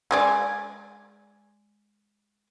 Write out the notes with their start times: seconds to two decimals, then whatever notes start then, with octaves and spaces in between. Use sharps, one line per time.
0.11 G#3 G#4 D5